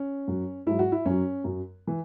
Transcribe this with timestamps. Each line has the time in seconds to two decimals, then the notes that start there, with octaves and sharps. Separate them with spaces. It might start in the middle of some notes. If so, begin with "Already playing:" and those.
Already playing: C#4
0.27 F#2 F#3
0.67 G#2 F#3 E4
0.79 F#4
0.92 E4
1.05 F#2 F#3 C#4
1.44 F#2 F#3
1.87 E3